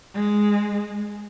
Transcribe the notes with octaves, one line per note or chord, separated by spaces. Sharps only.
G#3